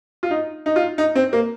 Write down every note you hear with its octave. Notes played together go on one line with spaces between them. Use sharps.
F4
D#4
D#4
F4
D#4
C4
A#3